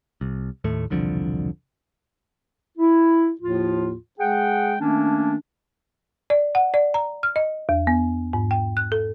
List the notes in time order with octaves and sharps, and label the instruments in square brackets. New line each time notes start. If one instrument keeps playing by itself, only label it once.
[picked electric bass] C2
D#2 A2 A3
E1 C2 D3 F3
[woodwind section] E4
D#2 A2 F3 F4
G#3 G#4 F#5 G5
D#3 A3 A#3 C#4 D4
[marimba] D5
F#5
D5
A#5
F6
D#5
E2
B3
G#2
G5
F#6
A4